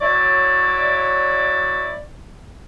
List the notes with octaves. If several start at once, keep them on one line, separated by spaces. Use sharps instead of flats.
F#3 E4 C#5 D5